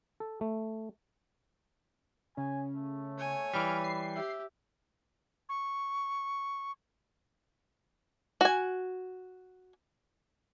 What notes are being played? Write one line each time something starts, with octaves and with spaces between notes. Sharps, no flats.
A4
A3
C#3 C#4 G#5
A3
C#5 G#5
E3 G3 B5 F6 D7
C7
G4 E5
C#6
F#4 G#5